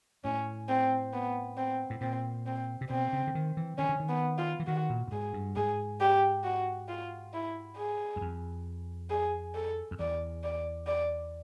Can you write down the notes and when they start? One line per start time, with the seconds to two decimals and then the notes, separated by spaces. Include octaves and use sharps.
0.24 A2 C#4
0.69 C4
1.13 B3
1.57 C4
1.90 A2
2.01 A#2 C4
2.46 C4
2.81 C3
2.90 B2 C4
3.13 C#3
3.27 D3
3.35 D#3
3.57 E3
3.78 D#3 C#4
3.89 D3
4.00 D#3
4.09 B3
4.38 F4
4.60 E3
4.67 D#3 F#4
4.90 A#2
5.08 A2
5.11 G#2 G#4
5.34 G2
5.56 G#2 G#4
6.00 G4
6.44 F#4
6.89 F4
7.34 E4
7.77 G#4
8.16 F#2
8.21 F2
9.10 G#4
9.55 A4
9.91 F2
9.99 E2 D5
10.43 D5
10.87 D5